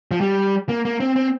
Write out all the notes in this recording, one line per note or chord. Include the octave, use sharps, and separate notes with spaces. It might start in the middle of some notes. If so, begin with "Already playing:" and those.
F3
G3
A#3
A#3
C4
C4